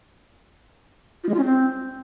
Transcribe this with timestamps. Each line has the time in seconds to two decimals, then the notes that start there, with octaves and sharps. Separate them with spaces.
1.24 F4
1.29 G#3
1.34 F4
1.39 C#4
1.44 C4